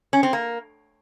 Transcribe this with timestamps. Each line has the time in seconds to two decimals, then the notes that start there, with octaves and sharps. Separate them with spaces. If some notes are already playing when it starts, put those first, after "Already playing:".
0.13 C#4
0.23 C4
0.33 A#3